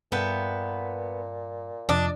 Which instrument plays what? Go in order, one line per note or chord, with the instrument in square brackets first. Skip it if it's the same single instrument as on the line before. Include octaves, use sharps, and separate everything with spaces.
[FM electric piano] G2 [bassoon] A#2 [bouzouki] B3 [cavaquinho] A4 E5 G5
[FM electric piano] F2 C3 F3 [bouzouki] D4 [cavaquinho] D5 D#5